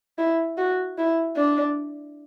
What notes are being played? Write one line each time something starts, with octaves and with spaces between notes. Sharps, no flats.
E4
F#4
E4
D4